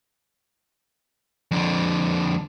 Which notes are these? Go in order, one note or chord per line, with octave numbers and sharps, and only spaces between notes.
F2 D3